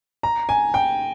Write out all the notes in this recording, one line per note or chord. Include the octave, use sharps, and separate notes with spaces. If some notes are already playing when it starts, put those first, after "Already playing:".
A#5
G#5
G5